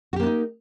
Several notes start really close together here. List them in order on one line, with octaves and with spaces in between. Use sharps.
F#4 G4 A#3 D4 D#4